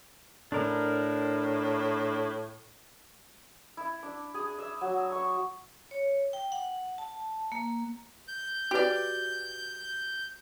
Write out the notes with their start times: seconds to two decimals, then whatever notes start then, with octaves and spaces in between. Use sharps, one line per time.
0.52 A2 D4 A#4
3.77 E4
4.03 D4
4.34 G#4
4.59 E5
4.81 F#3
5.12 C#6
5.91 C#5
6.33 G5
6.52 F#5
6.98 A5
7.52 A#3
8.28 G6
8.71 F#4 G4 B4 D5